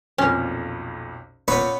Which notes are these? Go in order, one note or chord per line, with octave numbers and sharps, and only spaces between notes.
B1 F2 A#2 C#4
A#2 B3 C#4 B4